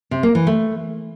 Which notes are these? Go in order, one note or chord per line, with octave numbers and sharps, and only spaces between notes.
C3
A#3
E3
A3